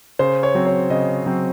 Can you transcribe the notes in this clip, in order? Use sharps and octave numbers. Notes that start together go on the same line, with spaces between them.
C#3 C5
C#5
F#3 C4
C#5
C#3 D#5
F#3 C4